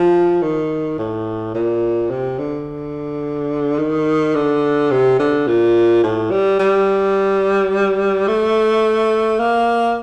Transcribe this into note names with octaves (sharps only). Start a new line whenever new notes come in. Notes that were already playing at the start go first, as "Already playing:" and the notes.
Already playing: F3
D#3
A2
A#2
C3
D3
D#3
D3
C3
D3
A#2
A2
G3
G3
A3
A#3